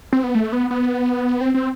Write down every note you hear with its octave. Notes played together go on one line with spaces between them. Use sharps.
C4
B3
A3
B3
B3
C4
C4